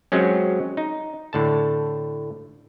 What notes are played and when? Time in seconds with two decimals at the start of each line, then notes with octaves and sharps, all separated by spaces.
0.12 F#3 G#3 C4 C#4
0.77 D#4
1.33 A2 D3 A5